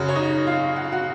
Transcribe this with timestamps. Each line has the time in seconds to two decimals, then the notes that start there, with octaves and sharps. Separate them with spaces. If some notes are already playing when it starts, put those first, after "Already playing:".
Already playing: F#2 C#3 F#3 F#4 F#5
0.09 C#5
0.15 D#4 D#5
0.47 F4 F5
0.76 F#5
0.84 F5
0.92 F#4 F#5